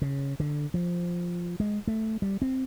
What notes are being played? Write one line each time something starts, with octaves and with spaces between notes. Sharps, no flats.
C#3
D3
F3
G#3
A3
G3
C4